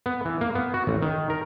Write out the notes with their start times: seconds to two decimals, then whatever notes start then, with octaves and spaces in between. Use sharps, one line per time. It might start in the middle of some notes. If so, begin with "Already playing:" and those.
0.06 B3
0.25 E3
0.41 A#3
0.55 B3
0.74 F#4
0.87 A1
1.02 D#3
1.30 A#4